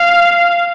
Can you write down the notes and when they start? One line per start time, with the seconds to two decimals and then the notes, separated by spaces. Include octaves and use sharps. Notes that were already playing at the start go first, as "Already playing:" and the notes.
Already playing: F5